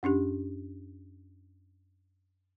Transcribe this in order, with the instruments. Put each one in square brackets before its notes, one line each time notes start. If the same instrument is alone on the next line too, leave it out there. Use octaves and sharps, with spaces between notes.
[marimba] F#2 C#4 D4 G4